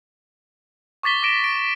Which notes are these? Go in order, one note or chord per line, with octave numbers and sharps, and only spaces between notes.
C#6 D6 A6 B6 G7
D6 A#6 D7 E7
D7